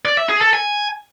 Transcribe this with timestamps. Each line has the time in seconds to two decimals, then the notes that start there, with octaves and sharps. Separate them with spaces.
0.05 D5
0.17 E5
0.29 G#4
0.41 A4
0.53 G#5